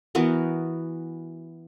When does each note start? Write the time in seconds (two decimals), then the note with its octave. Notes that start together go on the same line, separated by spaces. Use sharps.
0.15 E3 B3 F#4 A#4